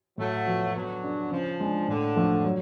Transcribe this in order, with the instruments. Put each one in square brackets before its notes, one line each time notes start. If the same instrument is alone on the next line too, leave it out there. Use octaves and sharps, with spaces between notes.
[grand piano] A2 [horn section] F#3 A3
[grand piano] F3 B3 F#4
[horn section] D3 F#3 [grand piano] B3
[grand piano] D4 G#4
[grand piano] C#3 [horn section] F3
[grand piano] G#3 D4
[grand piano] A2 [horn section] D3
[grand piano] F3 A3 D4 F4
F#3